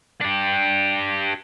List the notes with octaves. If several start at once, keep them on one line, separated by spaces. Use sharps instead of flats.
D4 G4